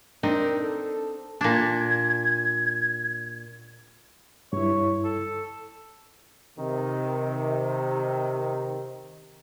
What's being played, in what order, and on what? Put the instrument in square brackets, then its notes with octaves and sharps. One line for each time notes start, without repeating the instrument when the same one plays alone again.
[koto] C4 D#4 [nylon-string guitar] D4 [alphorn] A#4
[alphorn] A4
[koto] A#2 D4 [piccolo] G#6
[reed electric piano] G2 E4 [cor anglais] C#5
[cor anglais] A4
[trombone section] C3 D#3